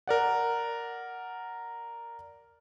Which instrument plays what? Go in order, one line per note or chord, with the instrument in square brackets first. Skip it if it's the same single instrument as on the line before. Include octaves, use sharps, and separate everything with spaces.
[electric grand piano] A#4 D5 F#5